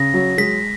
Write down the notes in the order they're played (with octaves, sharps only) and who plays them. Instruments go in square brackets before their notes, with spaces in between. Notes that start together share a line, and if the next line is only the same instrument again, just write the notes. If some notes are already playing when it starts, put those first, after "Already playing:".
Already playing: [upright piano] C#3 [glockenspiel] A#6
[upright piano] F#3
[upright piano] G#3 [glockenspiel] B6